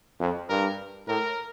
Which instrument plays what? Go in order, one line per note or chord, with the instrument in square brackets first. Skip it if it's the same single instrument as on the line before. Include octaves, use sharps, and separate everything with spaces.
[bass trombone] F2
[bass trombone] G2 [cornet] A#4
[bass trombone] A2 [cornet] A#4